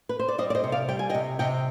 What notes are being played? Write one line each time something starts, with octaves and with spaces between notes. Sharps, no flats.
B4
C5
D5
G3 C5 D#5
D5
C5 D#5
C3
D5 F5
G3 G5
G#5
D#5 G5
C3
C3 D#5 G5